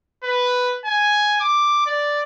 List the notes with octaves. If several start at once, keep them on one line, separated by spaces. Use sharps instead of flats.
B4
G#5
D6
D5